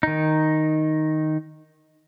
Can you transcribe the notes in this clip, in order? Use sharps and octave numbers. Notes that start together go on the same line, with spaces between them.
D#3 D#4